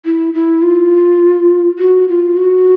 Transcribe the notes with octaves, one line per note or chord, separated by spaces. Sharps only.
E4
E4
F4
F#4
F4
F#4